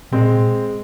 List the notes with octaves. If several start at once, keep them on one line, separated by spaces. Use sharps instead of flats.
A#2 G#3 C4